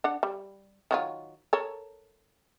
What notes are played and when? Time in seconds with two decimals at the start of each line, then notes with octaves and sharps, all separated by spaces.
0.04 D4 F#5
0.23 G3
0.91 D#3 F#3 F4
1.53 A4 A#4 C#5